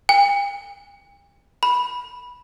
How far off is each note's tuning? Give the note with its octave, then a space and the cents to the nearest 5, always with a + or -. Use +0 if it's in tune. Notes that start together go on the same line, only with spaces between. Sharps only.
G5 +45
B5 -10